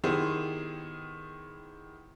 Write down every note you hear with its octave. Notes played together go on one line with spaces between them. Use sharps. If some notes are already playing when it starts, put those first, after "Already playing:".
D#3 B3 E4 G4 G#4 C5